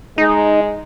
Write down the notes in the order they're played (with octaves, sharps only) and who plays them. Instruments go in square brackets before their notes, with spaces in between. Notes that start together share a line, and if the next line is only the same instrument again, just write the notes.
[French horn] G#3 [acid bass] D#4